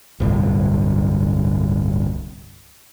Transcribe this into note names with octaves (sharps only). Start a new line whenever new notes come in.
D1 G1 C2